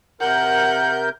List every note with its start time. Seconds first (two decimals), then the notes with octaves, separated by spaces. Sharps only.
0.21 C3 A#4 F#5 G6